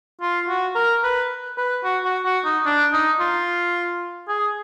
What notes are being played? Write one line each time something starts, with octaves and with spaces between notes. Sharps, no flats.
F4
F#4
A#4
B4
B4
F#4
F#4
F#4
D#4
D4
D#4
F4
G#4